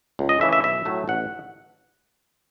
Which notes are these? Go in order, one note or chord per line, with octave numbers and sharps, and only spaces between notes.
C#2
D#5
C#3 E3 A3 E5
E5
B1 E5
A2 F#3 A3
A1 F#5